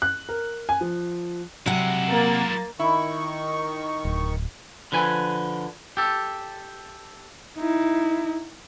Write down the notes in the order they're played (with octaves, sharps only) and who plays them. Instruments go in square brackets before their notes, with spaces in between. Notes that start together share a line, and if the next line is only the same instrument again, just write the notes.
[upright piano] F#6
A#4
G#5
F3
[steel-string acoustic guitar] C3 F#5 [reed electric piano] F#3 [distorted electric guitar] G#3 E4
[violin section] A#3 A6
[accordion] D#3 C#6 [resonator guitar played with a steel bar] E4
[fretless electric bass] D1
[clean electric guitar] D3 F3 B4 G#5
G4 A4
[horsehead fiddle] D#4 E4